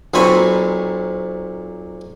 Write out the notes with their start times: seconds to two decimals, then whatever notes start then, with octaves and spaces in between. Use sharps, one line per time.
0.14 B1 A#2 C4 G#5 B5 C#6